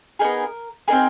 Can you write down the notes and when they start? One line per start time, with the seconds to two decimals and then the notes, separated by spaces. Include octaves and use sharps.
0.19 B3 D#4 G#4 A#4
0.88 C4 D#4 G#4 A#4